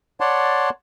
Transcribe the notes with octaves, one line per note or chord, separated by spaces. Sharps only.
C#5 D5 F#5 A5 C6